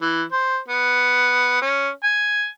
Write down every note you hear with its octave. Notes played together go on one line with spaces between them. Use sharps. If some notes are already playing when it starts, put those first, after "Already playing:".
E3
C5
B3
C#4
G#5